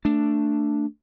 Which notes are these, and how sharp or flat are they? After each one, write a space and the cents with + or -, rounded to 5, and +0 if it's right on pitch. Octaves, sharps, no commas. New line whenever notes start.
A3 +15 D4 +0